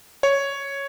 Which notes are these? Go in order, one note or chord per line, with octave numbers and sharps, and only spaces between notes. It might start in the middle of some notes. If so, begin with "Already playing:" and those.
C#5